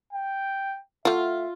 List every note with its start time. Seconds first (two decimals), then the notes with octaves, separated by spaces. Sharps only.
0.12 G5
1.05 A3 F4 E5 F#5